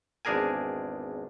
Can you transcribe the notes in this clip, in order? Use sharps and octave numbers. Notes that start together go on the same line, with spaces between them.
G#1 E2 D4 G#4 A#4 G#5